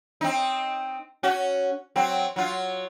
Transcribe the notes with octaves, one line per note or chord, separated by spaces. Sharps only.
C4 D#4
C#4 F#4
F#3 C4
F#3 F4